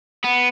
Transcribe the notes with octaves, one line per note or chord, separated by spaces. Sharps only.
B3